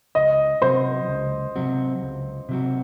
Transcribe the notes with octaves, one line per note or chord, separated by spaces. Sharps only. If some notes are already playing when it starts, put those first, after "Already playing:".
C#2 D#5
C3 F#3 C4 F#4 C5
C#2
C3 F#3 C4 F#4
C#2
C3 F#3 C4 F#4